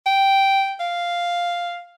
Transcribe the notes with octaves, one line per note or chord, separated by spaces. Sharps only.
G5
F5